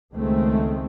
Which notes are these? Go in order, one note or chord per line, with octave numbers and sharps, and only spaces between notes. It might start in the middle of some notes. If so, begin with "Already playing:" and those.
C#2 D#3 G#3 A3 C4